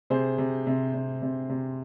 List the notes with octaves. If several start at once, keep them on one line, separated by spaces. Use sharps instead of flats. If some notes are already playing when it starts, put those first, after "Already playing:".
C3 G#4 C5
C3
C3
C3
C3
C3